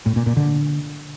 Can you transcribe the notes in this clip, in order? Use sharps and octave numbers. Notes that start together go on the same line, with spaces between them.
A2
A#2
A#2
D3